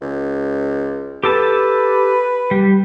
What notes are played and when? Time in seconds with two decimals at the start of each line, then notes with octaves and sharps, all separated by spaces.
0.02 C#2
1.23 G4 A4 B4 A5
2.51 G3